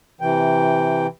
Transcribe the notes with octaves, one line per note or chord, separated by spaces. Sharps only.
C3 E3 G5